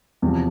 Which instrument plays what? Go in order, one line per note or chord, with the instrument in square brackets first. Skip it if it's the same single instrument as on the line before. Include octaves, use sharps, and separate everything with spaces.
[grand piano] E2 C3 F3